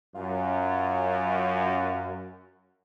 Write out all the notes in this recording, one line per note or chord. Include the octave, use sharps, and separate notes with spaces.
F#2 F4